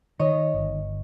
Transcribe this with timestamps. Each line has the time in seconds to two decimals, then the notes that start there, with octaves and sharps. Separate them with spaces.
0.19 D#3 C#5 D#5
0.54 G1